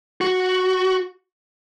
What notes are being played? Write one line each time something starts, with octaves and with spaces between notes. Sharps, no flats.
F#4